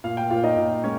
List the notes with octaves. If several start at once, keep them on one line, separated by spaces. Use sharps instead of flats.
A#2 F5
G5
A#2 F4 F5
D#4 D#5
A#2
G#3 C#4 C#5